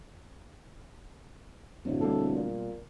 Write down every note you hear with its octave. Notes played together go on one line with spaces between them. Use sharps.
D1 B1 F#2 A2
B2 G3 A#3 A4
A#2